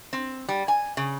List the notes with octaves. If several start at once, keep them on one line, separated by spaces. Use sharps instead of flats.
C4
G3
G#5
C#3